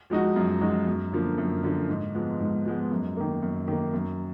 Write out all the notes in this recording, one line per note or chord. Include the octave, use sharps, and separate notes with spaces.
F3 G#3 D#4 F#4
F#2
F3 G#3 D#4 F#4
F#2
D3 F3 A#3
F#2
D3 F3 A#3
G#2
F3 G#3 B3
G#2
F3 G#3 B3
F#2
D#3 A#3
F#2
D#3 A#3
F#2